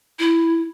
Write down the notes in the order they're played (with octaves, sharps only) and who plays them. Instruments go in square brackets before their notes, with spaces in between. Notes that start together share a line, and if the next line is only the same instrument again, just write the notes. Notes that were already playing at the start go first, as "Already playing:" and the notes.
[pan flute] E4